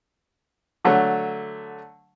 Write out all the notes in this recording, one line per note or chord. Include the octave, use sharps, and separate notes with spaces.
D3 F#3 A3